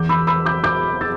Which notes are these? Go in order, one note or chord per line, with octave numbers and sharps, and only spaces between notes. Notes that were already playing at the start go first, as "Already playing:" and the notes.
Already playing: E2 E3 D6 G6
B5 E6
B5 E6
D6 G6
D6 G6
E6 A6